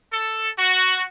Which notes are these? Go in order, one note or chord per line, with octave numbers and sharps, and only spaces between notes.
A4
F#4